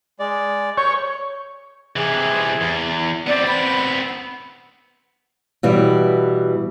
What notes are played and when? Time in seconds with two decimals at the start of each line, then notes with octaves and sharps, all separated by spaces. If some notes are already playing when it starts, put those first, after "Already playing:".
0.19 G#3 D5
0.77 C#5 G6
1.96 C3 E3 G#4
2.61 E2
3.27 B3 C4 D5
3.47 B5
5.63 B2 E3 G3